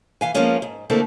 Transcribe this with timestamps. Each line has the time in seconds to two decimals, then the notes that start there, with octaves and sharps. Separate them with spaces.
0.21 E3 F5 G#5
0.34 F3 G#3 A#3 B3 C#4 F4
0.62 G#2
0.90 D3 A3 A#3 C4 E4 A4